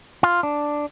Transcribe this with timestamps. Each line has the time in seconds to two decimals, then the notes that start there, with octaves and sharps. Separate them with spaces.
0.23 F4
0.43 D4